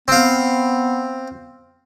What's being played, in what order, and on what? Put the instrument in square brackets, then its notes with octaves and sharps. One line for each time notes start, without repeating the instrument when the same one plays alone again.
[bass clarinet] B3 [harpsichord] C4 F5